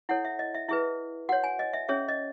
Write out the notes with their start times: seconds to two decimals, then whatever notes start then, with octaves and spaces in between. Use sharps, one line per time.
0.09 E4 A4 C#5 F#5
0.25 E5
0.39 D#5
0.54 E5
0.69 E4 G#4 B4 E5
1.29 F#4 C#5 F#5
1.44 G#5
1.59 D#5
1.73 E5
1.89 C#4 G#4 C#5 E5
2.08 D#5